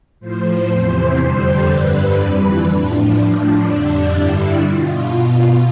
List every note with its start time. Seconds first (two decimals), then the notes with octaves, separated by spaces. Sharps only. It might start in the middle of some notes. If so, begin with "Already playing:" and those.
0.20 A2 F3 C5
0.68 E2 C3 E3 C5
1.18 F2 D3 G3
1.67 G2 D3 G3 B4
2.16 F2 E3 G3 B4
2.66 A2 F3 D4
3.14 A2 F3
3.63 F2 D3 G3
4.12 G2 D3 G3 E4
4.61 B2 F4